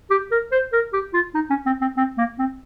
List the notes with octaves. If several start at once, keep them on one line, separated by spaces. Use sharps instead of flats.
G4
A#4
C5
A#4
G4
F4
D#4
C#4
C4
C4
C4
A#3
C4